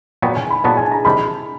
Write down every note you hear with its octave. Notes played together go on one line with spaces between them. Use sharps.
A#2 F#3 B3 G5
G#5
B5
A#2 F#3 B3 A5
G#5
A#5
C3 D#3 G3 B5